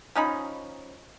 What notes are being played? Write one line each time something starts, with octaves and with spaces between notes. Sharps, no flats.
F3 C#4 D#4 B5